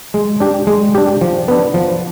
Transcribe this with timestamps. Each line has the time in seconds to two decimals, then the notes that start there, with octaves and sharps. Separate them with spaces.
0.14 G#3
0.40 D4 G4
0.67 G#3
0.95 D4 G4
1.21 F3
1.48 B3 D4
1.74 F3